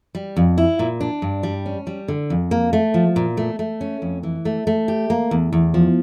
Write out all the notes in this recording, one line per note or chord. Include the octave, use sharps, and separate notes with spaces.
G3
F2
E4
A#2
D4
G2
G3
C#4
G3
D3
F2
A#3
A3
F3
A#2
A3
A3
C#4
F2
E3
A3
A3
G4
A#3
E2
E2
F3